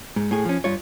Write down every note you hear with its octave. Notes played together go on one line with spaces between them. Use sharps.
G#2
A2 G#4
F3 C#4
G2 F4 C#5